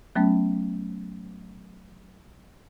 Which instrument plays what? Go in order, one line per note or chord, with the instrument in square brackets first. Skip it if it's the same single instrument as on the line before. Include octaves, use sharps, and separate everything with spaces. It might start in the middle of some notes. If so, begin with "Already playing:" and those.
[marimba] F#3 A3 B3 C#4